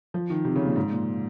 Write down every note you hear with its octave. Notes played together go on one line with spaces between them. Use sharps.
F3
D#3
C3
C#3
A#2
G#2
A#2